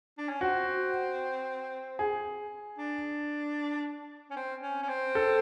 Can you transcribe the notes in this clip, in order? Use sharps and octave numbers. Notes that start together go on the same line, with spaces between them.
D4
C#4
C4 F#4
G#4
D4
C#4
C4
C#4
C#4
C4
A4